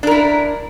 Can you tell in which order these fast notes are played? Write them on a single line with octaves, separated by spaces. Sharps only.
D4 A#4 E4